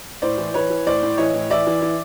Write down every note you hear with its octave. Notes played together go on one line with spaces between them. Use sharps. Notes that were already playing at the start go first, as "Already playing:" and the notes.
A2 C5 D5
E3
E3 B4 C#5
E3
A2 C5 D5
A2
E3 C#5 D#5
A2
E3 D5 E5
E3
E3